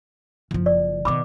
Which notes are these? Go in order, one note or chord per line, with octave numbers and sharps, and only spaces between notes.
F#1 F3
D5
B2 D#3 B5 D6